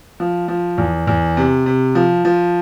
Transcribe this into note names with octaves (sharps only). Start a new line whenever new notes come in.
F3
F3
E2
E2
C3
C3
F3
F3